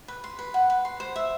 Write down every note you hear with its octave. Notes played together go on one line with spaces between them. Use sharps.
B4
C6
B4
F#5
B4
C6
C5
E5